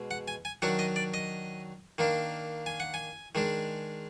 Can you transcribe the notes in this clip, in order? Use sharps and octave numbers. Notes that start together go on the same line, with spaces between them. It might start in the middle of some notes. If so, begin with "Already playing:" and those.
Already playing: B2 G#3
F#5
G#5
G#5
D#3 F#3 D4 F#5
D#5
D5
D#5
D#3 A#3 D4
G#5
F#5
G#5
D#3 G#3 D4